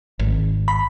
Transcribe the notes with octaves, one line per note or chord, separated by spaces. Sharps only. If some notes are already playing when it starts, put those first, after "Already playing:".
G#1
B5